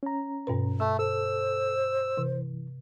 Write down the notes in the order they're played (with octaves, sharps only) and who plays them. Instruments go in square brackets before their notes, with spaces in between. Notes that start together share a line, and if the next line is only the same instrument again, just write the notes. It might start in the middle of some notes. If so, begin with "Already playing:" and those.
[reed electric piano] C#4 A#5
[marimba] G2 B2 B4
[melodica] A3 [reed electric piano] E6
[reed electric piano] A4 [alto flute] C5 [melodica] E6
[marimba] C3 [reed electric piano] E3